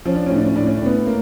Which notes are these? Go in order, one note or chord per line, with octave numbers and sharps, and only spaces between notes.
F3 C#4
D4
A2 C#4
D4
C#4
A2 D4
C#4
D4
A2 B3 C#4
A#3